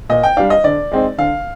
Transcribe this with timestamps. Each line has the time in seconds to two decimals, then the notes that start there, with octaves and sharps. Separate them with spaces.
0.09 A#2 D#5
0.23 G5
0.37 G3 D4 F5
0.50 D#5
0.64 D3 D5
0.91 G#3 C4 D#4
1.18 D3 F5